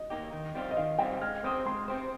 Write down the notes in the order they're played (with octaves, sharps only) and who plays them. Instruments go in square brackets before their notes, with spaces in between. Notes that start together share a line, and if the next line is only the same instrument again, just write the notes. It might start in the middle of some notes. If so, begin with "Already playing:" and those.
Already playing: [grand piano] D#5
[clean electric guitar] A#3 D#4 G4
D#3
G3 C4 F4
[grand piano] D#5
[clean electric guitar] D#3 [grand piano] F5
[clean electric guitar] G3 C4 F4 [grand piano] G5
[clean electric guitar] G#3 [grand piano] F6
[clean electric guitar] C4 G4 C5 [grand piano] D#6
[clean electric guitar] G#3 [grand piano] C6
[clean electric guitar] C4 G4 C5